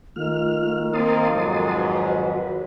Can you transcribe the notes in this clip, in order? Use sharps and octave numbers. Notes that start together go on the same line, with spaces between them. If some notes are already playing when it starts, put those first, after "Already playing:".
D#3 A3 F4 F6
A#3 C4 D#4 A5 C6 D#6
F2 G#2 F#3
F#4 B4